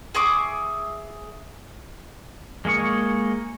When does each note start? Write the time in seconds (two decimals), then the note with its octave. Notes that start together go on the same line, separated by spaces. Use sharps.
0.15 G#4 E5 C#6 D6
2.65 G#3 A#3 G#4 C#6